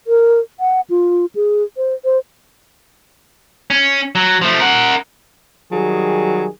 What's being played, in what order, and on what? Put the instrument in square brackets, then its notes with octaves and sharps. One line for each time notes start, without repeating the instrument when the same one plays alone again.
[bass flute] A#4
F#5
F4
G#4
C5
C5
[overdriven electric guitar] C#4
F#3
F3 A3
A#4 F#5
[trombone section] D#3 G3 G#4 [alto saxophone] F#3